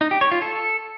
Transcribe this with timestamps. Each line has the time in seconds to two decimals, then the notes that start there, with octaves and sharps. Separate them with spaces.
0.01 D#4
0.11 G4
0.21 C#5
0.31 F4
0.42 A4